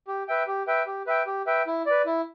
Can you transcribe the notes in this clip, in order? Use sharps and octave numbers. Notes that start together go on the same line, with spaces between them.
G4
B4 E5 G5
G4
B4 E5 G5
G4
B4 E5 G5
G4
B4 E5 G5
E4
B4 D5
E4